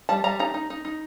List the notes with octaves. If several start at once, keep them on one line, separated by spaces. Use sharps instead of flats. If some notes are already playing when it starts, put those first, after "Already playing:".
G3 A5
G3 A#5
D#4 A#5
D#4
D#4
D#4